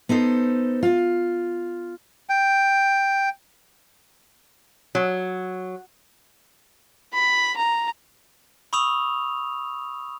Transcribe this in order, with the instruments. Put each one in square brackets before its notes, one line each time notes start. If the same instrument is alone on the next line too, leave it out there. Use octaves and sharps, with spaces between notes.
[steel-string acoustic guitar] B3 D#4 A4 C5
F4
[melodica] G5
[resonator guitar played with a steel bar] F#3
[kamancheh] B5
A#5
[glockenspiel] B5 C#6 D#6 E6 F7